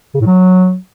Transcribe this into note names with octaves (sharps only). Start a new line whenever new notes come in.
C#3
A2
F#3